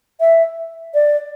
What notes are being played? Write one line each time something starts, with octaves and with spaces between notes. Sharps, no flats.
E5
D5